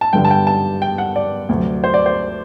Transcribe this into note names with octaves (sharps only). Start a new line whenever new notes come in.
A5
G2 D3 G3 G5
A5
G5
A5
G5
F#5
D5
D2 C3 F#3
C5
D5
C5